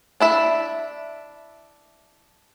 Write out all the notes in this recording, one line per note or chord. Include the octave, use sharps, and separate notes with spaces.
D4 E4 E5